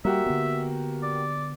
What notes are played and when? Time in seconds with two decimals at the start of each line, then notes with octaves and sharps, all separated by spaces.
0.05 G3 A#3 F#4 G4 E5
0.26 D3 B3
1.03 D5